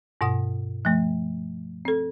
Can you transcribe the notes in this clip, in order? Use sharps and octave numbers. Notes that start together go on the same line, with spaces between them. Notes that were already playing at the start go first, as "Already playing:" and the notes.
G2 B2 F#5 D#6
F3 A3
C4 A4